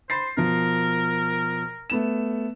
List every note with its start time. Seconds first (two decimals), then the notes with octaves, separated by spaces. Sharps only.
0.10 C5 B5 A6 C7
0.37 B2 F3 A#4
1.90 A3 B3 E7